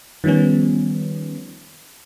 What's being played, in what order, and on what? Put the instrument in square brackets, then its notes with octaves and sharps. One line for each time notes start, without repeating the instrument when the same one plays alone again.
[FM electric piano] D#3 F3 G3 B3 C#4